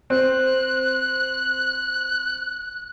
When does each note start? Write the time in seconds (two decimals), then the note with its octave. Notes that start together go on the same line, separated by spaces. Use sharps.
0.10 C4 F#6